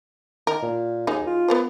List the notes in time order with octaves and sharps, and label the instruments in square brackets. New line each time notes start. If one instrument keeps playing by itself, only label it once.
[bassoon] D#3 [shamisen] A#4
[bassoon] A#2
[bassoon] D#2 [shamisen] F#3 D#4 G#4
[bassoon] F4
[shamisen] B3 A#4 C5